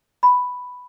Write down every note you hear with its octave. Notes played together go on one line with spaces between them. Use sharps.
B5